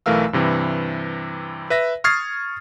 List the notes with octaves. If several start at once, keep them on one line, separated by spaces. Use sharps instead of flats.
B1 E3 A3 A#4 F5 E6
G2 C3 E3
B4 E5 A#6
C#6 D#6 F6 G#6 A6 C7